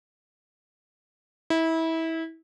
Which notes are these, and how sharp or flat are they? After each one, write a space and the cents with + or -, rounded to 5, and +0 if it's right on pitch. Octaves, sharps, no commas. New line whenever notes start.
E4 -25